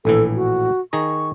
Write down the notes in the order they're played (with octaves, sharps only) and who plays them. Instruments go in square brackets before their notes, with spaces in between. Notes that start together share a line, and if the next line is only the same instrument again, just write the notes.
[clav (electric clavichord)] A#1 A2 E3 [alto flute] A4
[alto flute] F#4
[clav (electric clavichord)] D#3 G#4 A#5 [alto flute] C#6